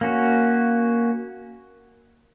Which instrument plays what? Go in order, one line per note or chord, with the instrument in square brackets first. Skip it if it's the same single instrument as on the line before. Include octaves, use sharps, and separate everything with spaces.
[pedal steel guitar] A#3 C#4 F#4